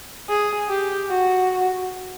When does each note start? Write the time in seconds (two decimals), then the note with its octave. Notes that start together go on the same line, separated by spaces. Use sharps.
0.29 G#4
0.69 G4
1.10 F#4